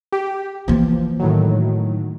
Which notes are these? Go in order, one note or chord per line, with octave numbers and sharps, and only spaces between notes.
G4
E3 F3 A#3
A2 D#3 F#3